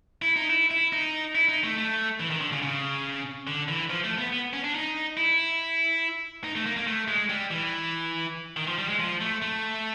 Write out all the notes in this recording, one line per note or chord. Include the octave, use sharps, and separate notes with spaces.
E4
D#4
E4
E4
D#4
E4
D#4
A3
A3
E3
D#3
D3
C#3
C#3
D3
E3
F3
A3
B3
B3
C#4
D4
D#4
E4
D#4
A3
A#3
A#3
A3
G#3
G3
E3
D#3
F3
G3
G#3
F3
A3
A3